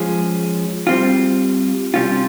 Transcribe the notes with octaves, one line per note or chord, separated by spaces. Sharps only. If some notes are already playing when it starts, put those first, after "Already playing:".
Already playing: F3 G#3 C#4
G3 C4 F4
C3 G3 C#4 F4